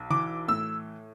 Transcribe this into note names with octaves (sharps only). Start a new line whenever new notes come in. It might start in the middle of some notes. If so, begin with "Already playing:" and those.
Already playing: B1
E3 D6
A2 E6